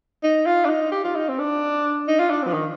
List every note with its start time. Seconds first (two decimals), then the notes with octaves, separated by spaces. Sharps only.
0.24 D#4
0.46 F4
0.65 D4
0.69 D#4
0.92 G4
1.04 F4
1.16 D#4
1.29 C4
1.39 D4
2.08 D#4
2.19 F4
2.30 D4
2.43 C4
2.47 F3
2.53 D#3